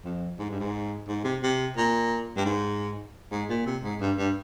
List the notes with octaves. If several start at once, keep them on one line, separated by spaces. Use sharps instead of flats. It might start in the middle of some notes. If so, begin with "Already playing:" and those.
F2
G#2
G2
G#2
G#2
C3
C3
A#2
G2
G#2
G#2
A#2
C3
G#2
G2
G2